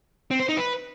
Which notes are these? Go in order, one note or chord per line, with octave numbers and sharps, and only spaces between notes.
C4
C5
D#4
B4